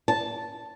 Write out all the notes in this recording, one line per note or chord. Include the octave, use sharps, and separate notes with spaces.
A5